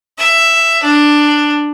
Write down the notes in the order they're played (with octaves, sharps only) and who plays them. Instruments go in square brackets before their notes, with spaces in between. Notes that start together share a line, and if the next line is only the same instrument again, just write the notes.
[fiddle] E5
D4